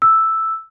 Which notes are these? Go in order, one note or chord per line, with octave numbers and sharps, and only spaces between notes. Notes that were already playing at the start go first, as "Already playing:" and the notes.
E6